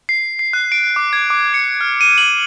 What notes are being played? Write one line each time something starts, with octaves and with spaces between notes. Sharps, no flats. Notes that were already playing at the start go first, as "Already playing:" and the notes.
C7
C7
F#6
D7
D6
G#6
D6
C#7
F6
D#7
F#7